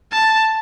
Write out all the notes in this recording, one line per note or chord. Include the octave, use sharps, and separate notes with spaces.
A5